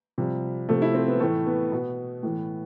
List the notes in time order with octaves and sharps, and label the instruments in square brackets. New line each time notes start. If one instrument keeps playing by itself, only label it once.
[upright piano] C3 F3 G3
C3 F3 A3
E4
C4
B3
A2 E3 A3
B3
B2
A2 E3